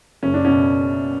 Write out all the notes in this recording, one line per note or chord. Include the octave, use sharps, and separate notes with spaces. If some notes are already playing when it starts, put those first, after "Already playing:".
F#1 C#4
D4
B2 C#4